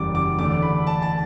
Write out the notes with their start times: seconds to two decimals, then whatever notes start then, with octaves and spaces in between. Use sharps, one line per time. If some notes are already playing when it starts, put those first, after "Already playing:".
Already playing: F#1 E2 C#3 G3 D6
0.15 D6
0.39 E2 D3 A3 D4 D6
0.62 B5
0.87 A5
1.02 A5